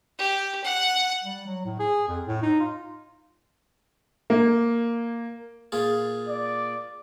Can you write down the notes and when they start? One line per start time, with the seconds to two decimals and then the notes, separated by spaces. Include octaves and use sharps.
0.19 G4
0.64 F#5
1.23 G3
1.47 F#3
1.65 A2
1.80 G#4
2.08 F2
2.27 A2
2.43 D#4
2.60 F4
4.30 A#3
5.72 A#2 F4 G#4
6.28 D5